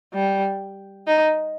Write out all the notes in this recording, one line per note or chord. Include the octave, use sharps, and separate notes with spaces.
G3
D#4